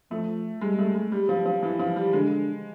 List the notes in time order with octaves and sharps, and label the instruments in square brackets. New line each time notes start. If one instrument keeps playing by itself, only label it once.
[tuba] F3 [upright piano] A3
[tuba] G3 [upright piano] G#3
[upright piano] A3
G#3
G3
F3
F3
E3
F3
G3
[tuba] D3 [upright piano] G#3